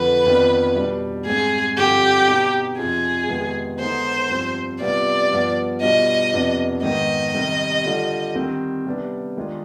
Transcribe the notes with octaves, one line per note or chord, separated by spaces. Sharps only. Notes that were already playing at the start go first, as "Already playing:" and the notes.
Already playing: F2 D3 F3 B4
F2 D#3 B3 D4 F4
B2 G3 D4
G#2 G3 C4 G#4
G2 D3 F3 C4 G4
B2 B3 D#4
F2 C3 F3 C4 F4 G#4
F2 C3 D#3 G#3 B3
D3 G#3 B3 D#4 C5
G2 F3 C4
C3 G3 B3 F4 D5
G2 F3 B3
B2 G3 D4 F4 D#5
F2 C3 F3 B3 D4
G#2 D#3 B3 D#5
C3 D#3 G3
D3 G3 D4 F4
D#3 G3 C4
C3 G3 B3 D4
D#3 G#3 D4 F4